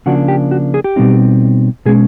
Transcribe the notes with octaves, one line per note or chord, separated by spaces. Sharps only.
C#3 F3 A#3 D4 F#4
G4
F#4
G#4
G4
B2 G3 C4 D#4
B2 G#3 C#4 G#4